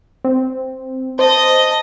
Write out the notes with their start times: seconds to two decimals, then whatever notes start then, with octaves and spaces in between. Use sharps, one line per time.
0.24 C4
1.19 C5 D#5 A5